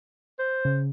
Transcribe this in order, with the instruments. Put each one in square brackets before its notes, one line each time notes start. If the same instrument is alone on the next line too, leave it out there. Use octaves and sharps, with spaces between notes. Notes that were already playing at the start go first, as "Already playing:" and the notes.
[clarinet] C5
[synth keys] C#3